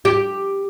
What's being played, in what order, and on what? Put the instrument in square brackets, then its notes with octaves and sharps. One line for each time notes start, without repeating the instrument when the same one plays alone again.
[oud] G4